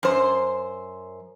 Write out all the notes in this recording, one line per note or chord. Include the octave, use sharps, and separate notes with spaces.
F#2 C5